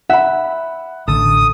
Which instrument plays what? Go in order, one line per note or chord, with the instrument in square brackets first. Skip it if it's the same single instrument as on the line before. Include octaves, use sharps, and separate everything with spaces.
[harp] E5 B5 [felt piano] F#5
[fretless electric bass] A1 D3 [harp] A4 [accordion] D#6